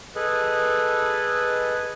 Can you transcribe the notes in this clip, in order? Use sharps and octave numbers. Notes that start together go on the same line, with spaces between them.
G#4 A4 B4 D#5